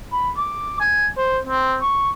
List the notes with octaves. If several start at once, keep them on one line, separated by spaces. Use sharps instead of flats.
B5
D6
G#5
C5
C4
C#6